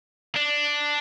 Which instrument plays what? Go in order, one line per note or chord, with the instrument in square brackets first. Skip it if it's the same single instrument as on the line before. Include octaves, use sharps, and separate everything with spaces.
[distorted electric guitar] D4